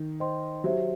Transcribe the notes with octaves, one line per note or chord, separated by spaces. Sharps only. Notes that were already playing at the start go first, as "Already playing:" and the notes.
Already playing: D#3
C5 D#5 G5 C6
F#3 G4 C5 E5